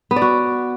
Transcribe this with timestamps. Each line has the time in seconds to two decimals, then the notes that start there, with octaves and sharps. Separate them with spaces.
0.11 B3
0.16 D5
0.22 F#4